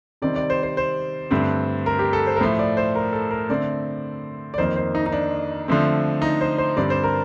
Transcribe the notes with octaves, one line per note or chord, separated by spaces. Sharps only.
C3 D#3 G3 C4 D5
D5
C5
C5
C5
G2 D3 A3 C4
A#4
G4
A4
C5
A#4
A2 F3 A3 C5
D5
C5
A#4
A4
A#4
D3 A3 C4 D5
D5
F2 D#3 A#3 C5
C5
D#4
D#4
D4
D3 F3 A3 C4
D#4
C5
C5
G2 D3 G3 C4 D5
C5
A#4